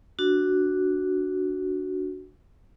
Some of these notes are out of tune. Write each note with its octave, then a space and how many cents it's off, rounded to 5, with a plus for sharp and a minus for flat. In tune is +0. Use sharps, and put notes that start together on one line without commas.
D4 +0 F#4 +0